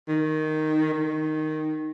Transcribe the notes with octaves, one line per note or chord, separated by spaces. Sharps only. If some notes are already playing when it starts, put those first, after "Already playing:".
D#3
D#3